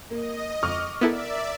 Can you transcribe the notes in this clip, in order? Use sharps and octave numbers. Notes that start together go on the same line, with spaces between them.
A#3 D#5
F2 C#6 D6 F6
B3 E4 A4 A#4 D5 E5